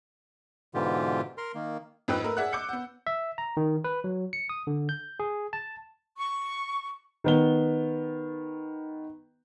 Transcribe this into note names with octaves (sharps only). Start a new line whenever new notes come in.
G#2 B2 D3 E3 F4 G4
A#4 A#5 C6
D#3 A#3
F2 G#2 B4 G5 E6 F#6
A3 A#3 A#4 B4
G#4 D5 E5 F#5 F#6
D6 E6 G6 C#7
B3 F#5
E5
A#5
D#3
B4
F#3
C#7
D#6
D3
G6
G#4
A5
C#6
D#3 B3 G7